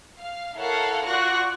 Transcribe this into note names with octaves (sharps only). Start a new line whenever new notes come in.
F5
E4 A4 A#4 C#5 F5 F#5
F4 F#4 D5 C#6 F#6 A#6